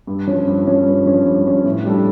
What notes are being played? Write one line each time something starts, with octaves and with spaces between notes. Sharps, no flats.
G2
F3 C#4
G2
F3 C#4
G2
F3 C#4
G2
F3 C#4
A2
G3 D4 A4